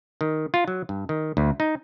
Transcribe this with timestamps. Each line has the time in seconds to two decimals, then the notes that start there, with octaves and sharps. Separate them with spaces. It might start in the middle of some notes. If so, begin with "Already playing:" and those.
0.21 D#3
0.54 F4
0.68 F#3
0.89 G2
1.09 D#3
1.37 D2
1.60 D#4